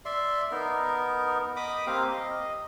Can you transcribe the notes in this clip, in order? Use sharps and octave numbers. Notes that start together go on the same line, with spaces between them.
D5 E5 C6
B3 D#4 A#4
D#5 B5 D6 D#6
A#3 C4 G4 F5
D#5